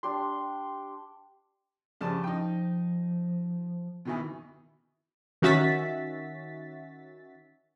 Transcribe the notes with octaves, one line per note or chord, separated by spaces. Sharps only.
D4 G4 C6
G2 C#3 F3 A5
D#4 G5
B2 D#3 E3
D#3 C#4 F#4 E5 A6 B6